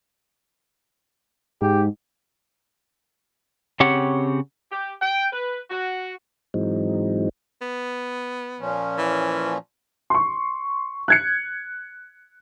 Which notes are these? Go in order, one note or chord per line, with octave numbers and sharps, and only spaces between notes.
G#2 G4
C#3 C4 G4 C#5 F#5
G4
G5
B4
F#4
G#2 E3 F#3 G#3 C4 D#4
B3
A#2 F3 C#4
E3
C6 C#6
F#6 G#6 C#7